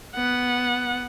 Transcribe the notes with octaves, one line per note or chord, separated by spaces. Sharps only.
B3 F#5